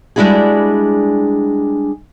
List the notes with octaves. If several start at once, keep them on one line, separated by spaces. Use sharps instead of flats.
G3 G#3 D4 E4 F#4 G#4